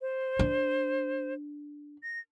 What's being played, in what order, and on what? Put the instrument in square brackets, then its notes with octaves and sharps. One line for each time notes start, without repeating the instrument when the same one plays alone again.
[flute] C5
[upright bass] D4
[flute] A#6